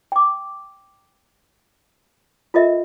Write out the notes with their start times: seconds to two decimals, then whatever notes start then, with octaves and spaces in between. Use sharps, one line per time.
0.12 G5 D6
2.54 F4 A4 A#4 D#5 E5